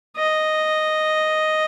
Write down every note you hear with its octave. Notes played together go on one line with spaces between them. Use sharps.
D#5